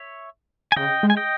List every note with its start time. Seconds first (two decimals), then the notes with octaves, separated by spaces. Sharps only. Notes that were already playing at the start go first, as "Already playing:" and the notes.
Already playing: C#5 E5
0.72 G#5
0.76 C#3 D#5 G5
1.03 G#3
1.10 G#5
1.17 D#5 G5